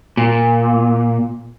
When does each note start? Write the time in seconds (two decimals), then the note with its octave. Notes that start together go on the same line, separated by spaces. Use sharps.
0.17 A#2